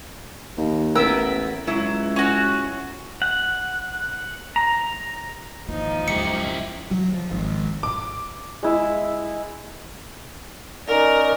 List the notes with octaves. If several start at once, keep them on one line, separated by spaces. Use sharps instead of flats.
D#2
A1 B3 E4 A#4 E6
C#2 F#3 E4
C#4 F#4
F#5
A#5
G#1 E2 F3 A#3 D#4
C#2 F#2 E4 G4 C#7
F#3
F3
G#1
D6
G#3 E4
C#4 D#4 A#4 D5